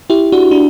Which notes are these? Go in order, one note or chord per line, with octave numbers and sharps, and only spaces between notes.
E4 G4
D4 F#4
D4